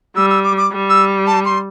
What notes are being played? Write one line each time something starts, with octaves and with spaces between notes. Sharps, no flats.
G3 E6
E6
D6
D6
G3
E6
A5
C6